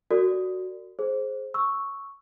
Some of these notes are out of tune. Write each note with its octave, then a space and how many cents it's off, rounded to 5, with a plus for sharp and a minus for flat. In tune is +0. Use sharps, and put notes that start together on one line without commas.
F#4 +0 A#4 -40 D5 +0
G#4 +25 C5 +10
C#6 +0 E6 -5